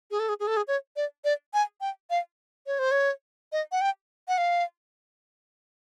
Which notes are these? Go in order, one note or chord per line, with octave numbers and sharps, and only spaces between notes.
G#4
A4
G#4
G#4
A4
G#4
C#5
D5
D5
G#5
G5
F5
C#5
C5
C#5
D#5
F#5
G5
F#5
F5